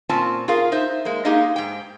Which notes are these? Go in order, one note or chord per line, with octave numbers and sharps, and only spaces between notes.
A#2 C4 C#4 F4 G#5 A5
F4 G#4 A#4 F5
D#4 C5 E5
G#3 A#3
A#3 D#4 G4 G#4 D#5 F5
G#2 G5